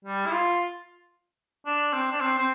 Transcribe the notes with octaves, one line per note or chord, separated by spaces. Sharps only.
G3
E4
F4
D4
C4
D4
C4
C4